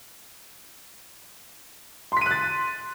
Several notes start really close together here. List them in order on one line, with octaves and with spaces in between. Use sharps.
C6 B6 D#7 F#6 A6